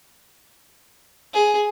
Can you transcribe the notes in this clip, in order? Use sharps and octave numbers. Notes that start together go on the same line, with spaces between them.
G#4